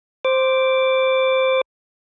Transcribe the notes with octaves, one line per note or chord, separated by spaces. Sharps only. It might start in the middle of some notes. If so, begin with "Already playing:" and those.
C5 D6